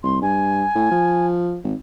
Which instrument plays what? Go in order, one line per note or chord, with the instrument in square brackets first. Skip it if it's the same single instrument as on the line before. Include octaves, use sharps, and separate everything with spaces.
[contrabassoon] C2 [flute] C6
[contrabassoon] G2 [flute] G#5
[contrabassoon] A2
F3
G#1